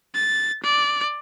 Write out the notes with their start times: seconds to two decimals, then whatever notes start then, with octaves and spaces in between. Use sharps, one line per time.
0.14 A6
0.63 D5